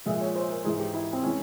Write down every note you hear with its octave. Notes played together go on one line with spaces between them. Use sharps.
A#2 F3 G#3 E5
C#5
C5
A#4
G#2 E3 G#3 G#4
G4
E4
C4
E3 G#3 C#4